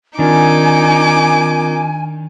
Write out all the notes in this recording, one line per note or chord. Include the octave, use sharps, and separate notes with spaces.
D#3 C4 D4 D#4 F4 A#4 G#5 D6